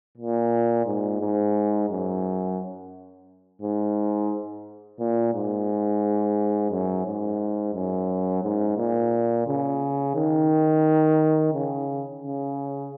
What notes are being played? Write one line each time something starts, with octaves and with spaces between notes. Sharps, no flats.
A#2
G#2
G#2
F#2
G#2
A#2
G#2
F#2
G#2
F#2
G#2
A#2
C#3
D#3
C#3
C#3